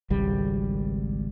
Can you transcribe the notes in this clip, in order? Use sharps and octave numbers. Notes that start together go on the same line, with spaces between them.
G#1 C#2 G3